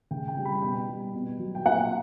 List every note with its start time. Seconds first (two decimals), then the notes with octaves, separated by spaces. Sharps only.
0.11 C#3 G5
0.28 G5
0.37 G3
0.45 B5
0.62 B2 G5
0.88 G3
1.14 B2
1.39 F#3
1.55 G5
1.66 A#2 F#5